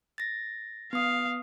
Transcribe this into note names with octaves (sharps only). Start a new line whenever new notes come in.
A6 A#6
B3 F5 D#6